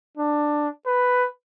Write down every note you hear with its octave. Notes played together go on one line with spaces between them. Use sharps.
D4
B4